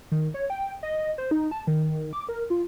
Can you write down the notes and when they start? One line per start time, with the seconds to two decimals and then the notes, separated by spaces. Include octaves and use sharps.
0.12 D#3
0.34 C#5
0.50 G5
0.83 D#5
1.18 C5
1.31 D#4
1.51 A5
1.67 D#3
2.13 D6
2.29 A#4
2.50 F4